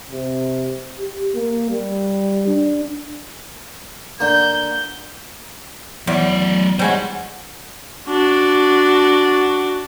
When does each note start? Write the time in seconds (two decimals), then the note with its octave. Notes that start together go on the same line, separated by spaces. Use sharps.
0.12 C3
0.98 G4
1.35 A#3
1.70 G3
2.47 D4
4.20 D3 A#3 G6
6.07 E2 F#3 D5
6.79 G3 G#3 F#4 C5 G#5
8.08 D4 F#4